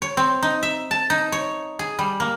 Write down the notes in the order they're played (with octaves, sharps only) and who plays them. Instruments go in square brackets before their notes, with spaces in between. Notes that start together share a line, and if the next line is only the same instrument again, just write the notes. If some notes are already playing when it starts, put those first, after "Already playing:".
[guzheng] C#5
C4
D#4
E5
A5
D#4
C#5
G#4
G3
A#3